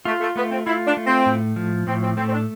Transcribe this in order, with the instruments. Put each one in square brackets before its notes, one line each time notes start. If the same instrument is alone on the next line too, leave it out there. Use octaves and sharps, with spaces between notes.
[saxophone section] A3 [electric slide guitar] F4
[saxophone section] A3
[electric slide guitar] A3 [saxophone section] B3
[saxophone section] C4
[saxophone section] E4 [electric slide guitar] F4
[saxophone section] D4
[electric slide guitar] A3
[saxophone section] C4
[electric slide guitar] A2
F3
[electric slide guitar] A2 [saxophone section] C4
[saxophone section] C4
[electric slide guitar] A3 [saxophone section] C4
[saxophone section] C4
D4